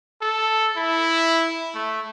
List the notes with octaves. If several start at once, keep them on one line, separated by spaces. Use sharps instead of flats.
A4
E4
A3